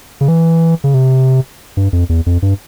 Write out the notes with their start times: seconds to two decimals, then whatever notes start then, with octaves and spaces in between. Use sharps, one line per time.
0.21 C#3
0.28 E3
0.84 C#3
0.94 C3
1.77 G2
1.93 F2
2.09 E2
2.26 F2
2.42 G2